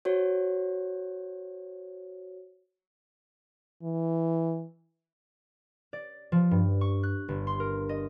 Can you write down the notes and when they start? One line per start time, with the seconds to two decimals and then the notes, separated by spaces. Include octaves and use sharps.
0.05 F#4 C5 C#5
3.83 E3
5.93 D5
6.32 F3
6.51 G2
6.81 C#6
7.03 F#6
7.28 G1
7.47 C6
7.60 A#4
7.89 D#5